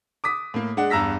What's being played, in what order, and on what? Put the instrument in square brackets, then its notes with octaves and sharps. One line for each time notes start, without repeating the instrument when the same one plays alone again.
[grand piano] D6 D#6 B6
A2 A#3
G#3 D4 F#5
E2 G2 A#5 E6 A#6 B6